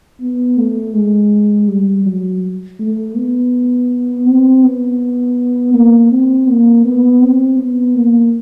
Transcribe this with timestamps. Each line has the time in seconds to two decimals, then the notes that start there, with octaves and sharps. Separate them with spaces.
0.21 B3
0.57 A3
0.94 G#3
1.68 G3
2.05 F#3
2.80 A3
3.16 B3
4.26 C4
4.63 B3
5.74 A#3
6.11 C4
6.48 A#3
6.85 B3
7.22 C4
7.59 B3
7.95 A#3